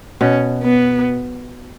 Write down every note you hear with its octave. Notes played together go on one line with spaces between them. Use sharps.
B2 C#4
B3